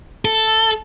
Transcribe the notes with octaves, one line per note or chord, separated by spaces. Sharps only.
A4